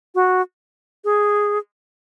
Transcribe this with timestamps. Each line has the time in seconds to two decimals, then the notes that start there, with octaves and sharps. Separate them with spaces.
0.15 F#4
1.05 G#4